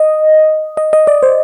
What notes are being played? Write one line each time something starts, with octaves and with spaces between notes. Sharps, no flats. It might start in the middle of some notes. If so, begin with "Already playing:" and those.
Already playing: D#5
D#5
D#5
D5
C5